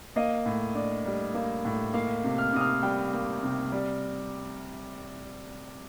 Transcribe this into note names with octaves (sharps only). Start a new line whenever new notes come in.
A#3 D#5
A2
D4
G3
A#3
A2
A#3 F5
C3
F6
C3 D#6
F6
G3 G5
A#3
C3
G3